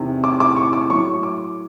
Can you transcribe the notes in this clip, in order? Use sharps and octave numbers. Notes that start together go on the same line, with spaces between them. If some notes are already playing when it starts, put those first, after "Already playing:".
Already playing: E2 C3 D#3
D6
D6
C#6
D6
A2 F#3 C#6
D6